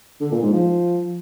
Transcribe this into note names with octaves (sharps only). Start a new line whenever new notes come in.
D3
A#2
G#2
F3